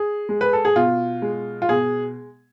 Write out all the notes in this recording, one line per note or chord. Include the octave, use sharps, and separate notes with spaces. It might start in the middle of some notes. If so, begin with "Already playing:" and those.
Already playing: G#4
G#3
B4
A4
G#4
B2 F4
G#3
F4
B2 G#4